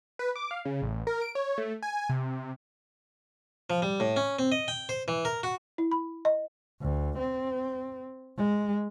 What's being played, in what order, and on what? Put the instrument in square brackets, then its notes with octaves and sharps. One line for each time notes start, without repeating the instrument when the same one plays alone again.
[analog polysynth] B4
D6
F5
C#3
A1
A#4
D7
C#5
A3
G#5
C3
[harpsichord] F3
G3
A2
C#4
C4
D#5
G5
C5
E3
A#4
F#4
[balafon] E4
B5
D#5
[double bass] D2
C4
G#3